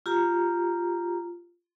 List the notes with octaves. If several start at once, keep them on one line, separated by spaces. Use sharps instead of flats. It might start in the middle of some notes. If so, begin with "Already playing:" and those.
F4 G4 A#5